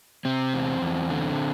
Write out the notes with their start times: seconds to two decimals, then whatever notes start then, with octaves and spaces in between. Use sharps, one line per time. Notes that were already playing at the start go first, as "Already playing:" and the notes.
0.25 C3 C4
0.54 E2
0.82 E2
1.10 D3